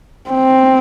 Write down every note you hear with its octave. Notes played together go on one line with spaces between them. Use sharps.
C4